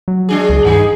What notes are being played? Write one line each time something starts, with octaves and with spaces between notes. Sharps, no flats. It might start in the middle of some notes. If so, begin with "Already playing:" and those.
F#3
G#3 D4 G#4
C#2
G2 D#3 D#4 G#4